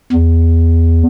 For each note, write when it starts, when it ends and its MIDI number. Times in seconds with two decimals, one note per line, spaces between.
0.12 1.03 40